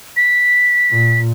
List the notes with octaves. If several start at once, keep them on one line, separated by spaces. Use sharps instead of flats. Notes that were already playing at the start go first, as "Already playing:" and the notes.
B6
A#2